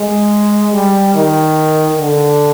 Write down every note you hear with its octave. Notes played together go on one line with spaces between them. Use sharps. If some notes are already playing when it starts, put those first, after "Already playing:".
Already playing: G#3
G3
D#3
D3